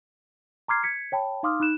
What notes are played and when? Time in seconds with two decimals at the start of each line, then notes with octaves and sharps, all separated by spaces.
0.68 A#5 C6 D6 F6 G#6 C7
0.83 G#6 B6 C#7
1.12 C#5 G5 A5 B5
1.43 D#4 F5 C6 D6 D#6 F6
1.60 D#4 B5 F#6 E7